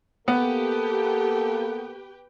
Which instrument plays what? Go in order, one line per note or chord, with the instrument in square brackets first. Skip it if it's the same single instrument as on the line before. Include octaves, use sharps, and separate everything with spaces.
[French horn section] A#3 A4 [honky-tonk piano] B3 [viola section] G4 B4 G5